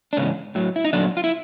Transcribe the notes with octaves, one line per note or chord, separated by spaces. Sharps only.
D4
G#2 C#3 E3 C#4
A2 F#3
E4
D#4
A#2 D3 F#3 D4
F4
E4